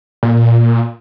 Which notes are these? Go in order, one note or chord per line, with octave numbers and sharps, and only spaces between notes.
A#2